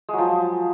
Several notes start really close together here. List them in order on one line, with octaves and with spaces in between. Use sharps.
G#3 F#3 F3